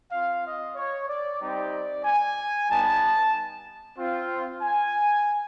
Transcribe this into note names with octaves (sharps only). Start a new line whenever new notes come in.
C4 F4 F5
D#5
C#5
D5
G3 C4 D#4 G4 D5
G#5
G3 B3 D#4 A5
C4 F4
G#5